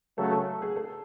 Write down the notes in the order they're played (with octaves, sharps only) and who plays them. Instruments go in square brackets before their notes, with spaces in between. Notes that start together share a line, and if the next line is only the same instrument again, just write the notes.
[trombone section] C#3 F#3 A3 [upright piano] A4
[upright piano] A4
G#4
A4